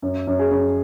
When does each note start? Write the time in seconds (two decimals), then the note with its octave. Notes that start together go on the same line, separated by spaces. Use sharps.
0.02 F#2
0.27 F#2
0.39 G#4
0.51 F#2